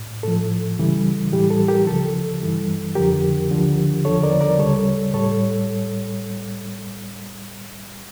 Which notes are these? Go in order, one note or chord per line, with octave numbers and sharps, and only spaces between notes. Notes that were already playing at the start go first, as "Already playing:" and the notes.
Already playing: A2
A2 F3 A4
C#2 C#3 E3 G3
A2 E3 G3 G4
A4
G4 A#4
C#2 C#3 F3 A4
G2 E3 G3
F2 D3 F3 G4 A#4
D2 D3 F3
E2 D3 F3 A4 C#5
A#4 D5
A#4 D5
D2 C#3 G3 A4 C#5
A2 G3 A4 C#5